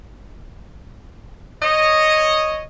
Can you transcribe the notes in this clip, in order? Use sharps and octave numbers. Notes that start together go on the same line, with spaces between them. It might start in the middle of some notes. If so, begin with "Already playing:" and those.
C#5 D#5